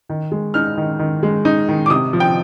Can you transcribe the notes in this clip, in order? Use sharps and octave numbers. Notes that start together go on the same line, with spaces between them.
D#3
G#3
D#4 F6
D#3
D#3
G#3
D#4
D#3
D6
C3 D#6
F3
G5